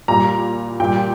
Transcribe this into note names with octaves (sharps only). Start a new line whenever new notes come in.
A#2 G3 A#5
A#2 G3 G5